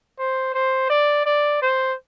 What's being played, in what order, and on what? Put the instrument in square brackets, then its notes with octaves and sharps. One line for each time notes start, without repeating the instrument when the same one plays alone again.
[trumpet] C5
C5
D5
D5
C5